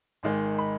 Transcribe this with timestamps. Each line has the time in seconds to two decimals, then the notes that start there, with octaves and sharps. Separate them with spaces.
0.23 G#1 G#2 D#3 G#3
0.59 B5